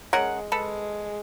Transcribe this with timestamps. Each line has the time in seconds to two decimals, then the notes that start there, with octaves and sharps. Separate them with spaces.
0.13 G#3 C#4 A#4 F#5
0.52 G#3 A4 B4